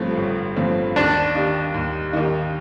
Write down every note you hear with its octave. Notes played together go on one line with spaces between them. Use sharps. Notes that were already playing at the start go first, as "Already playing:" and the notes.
Already playing: G1 G2 F3 A3 C4
G1
G2 F3 A3 C4
D#2 D4
D#3 A#3 D#4 G4
D#2
D#3 A#3 D#4 G4